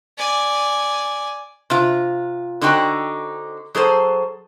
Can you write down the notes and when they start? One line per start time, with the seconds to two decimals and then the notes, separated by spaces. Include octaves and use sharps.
0.18 D5 G#5
1.70 C3 F4
2.61 D3 C4 D#4 F#4 G5
3.75 F#3 G#4 A4 C5